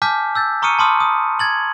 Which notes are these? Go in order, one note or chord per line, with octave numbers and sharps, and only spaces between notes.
G#5 A5 D6 F6 G6 B6
E6 G6 A6
A#5 C#6 D#6 F6 C#7 D#7
A5 B5 C6 D6 D#6 F6
D#6
G#6 A6 F#7